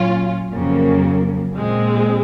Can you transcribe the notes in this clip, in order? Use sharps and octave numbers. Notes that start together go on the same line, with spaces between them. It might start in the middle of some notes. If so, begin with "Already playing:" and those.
Already playing: A#2 F#3 C#4 F4
F2 C#3 F#3 A#3
A#2 G#3 C4